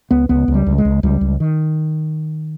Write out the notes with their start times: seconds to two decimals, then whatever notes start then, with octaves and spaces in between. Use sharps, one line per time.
0.11 C#2 B3
0.29 C#2 B3
0.48 C#2
0.54 G3
0.67 C#2
0.78 G#3
0.85 C#2
1.03 C#2 G3
1.21 C#2
1.40 D#3